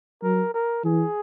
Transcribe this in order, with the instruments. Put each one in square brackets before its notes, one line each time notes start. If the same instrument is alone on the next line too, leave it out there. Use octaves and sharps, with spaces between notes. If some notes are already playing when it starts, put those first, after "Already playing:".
[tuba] F#3 [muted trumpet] A#4
[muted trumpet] A#4
[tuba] E3 [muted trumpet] G#4